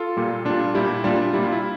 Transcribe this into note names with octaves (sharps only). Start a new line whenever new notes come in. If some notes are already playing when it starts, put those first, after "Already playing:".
Already playing: F4 A4
A#2 G3
A#2 G3 D4 F4
A#2 G3 E4 G4
A#2 G3 D4 F4
A#2 G3 E4
F4
E4